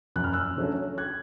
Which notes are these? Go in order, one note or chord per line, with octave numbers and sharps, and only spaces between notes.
F#2 F#6
F6
E6 F#6
D3 F#3 A3 C#4
F#6 G#6